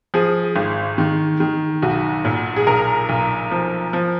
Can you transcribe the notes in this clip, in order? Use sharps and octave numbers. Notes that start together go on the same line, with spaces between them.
F3 G#4
G#1
D#3
D#3
B1 F#4
A#2
G#4
B1 A#4
B1
F3
F3